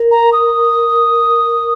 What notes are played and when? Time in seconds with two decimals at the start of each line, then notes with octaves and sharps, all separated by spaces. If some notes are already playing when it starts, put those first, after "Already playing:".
Already playing: A#4
0.11 A#5
0.33 D#6